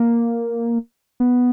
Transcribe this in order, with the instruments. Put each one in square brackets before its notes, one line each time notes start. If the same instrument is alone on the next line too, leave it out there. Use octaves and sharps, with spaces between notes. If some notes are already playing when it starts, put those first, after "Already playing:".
Already playing: [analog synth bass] A#3
B3